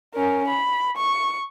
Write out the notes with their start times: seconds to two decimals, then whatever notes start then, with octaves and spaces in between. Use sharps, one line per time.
0.15 C#4 A#4
0.48 B5
0.97 C#6